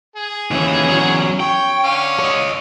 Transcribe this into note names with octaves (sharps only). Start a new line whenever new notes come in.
G#4
D#2 E3 C#4
E2 F#3
C#5 G5
D3 C#4 F5
C#5 D#5